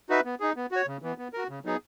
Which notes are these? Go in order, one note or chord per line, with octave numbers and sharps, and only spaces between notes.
D#4 F#4 B4 E5
B3
D#4 G#4
B3
F#4 C#5
C#3
E3 B3
B3
F#4 A#4
C#3
F#3 B3 D#4 G#4